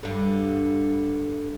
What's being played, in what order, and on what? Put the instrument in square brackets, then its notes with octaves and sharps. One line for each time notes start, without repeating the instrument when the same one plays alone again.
[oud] G2 D3